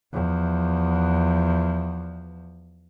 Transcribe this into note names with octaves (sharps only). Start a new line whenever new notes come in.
E2 F3